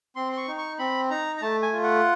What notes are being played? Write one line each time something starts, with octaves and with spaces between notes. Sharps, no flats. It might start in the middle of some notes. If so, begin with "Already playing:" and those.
C4 C6
C6
C#6
D#4
C#6
C4 B5
D#4 A#5
A#5
A3 A5
G#5
F4
F#5